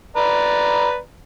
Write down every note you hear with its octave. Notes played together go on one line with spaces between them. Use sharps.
B4 D5 A#5